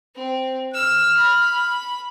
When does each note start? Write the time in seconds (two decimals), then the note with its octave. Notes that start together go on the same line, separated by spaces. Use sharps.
0.15 C4
0.74 E6 F6
1.17 B5